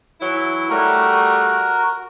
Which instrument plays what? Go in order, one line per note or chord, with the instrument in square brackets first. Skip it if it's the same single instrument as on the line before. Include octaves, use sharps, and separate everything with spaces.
[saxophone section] E3 F#3 E4
[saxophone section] G3 A3 [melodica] F#4 A#4